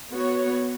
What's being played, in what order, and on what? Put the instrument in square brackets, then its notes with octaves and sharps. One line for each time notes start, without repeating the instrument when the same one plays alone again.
[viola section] B3 F#4 C#5